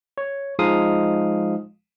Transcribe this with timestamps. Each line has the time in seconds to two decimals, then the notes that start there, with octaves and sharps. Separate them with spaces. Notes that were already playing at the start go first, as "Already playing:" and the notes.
0.18 C#5
0.59 F3 G#3 D#4 F5 D#6